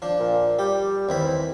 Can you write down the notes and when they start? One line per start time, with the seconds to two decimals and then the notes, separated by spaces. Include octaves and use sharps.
0.02 F3 D4
0.19 A#2
0.59 G3 G4
1.09 D#2 E3 C4 B5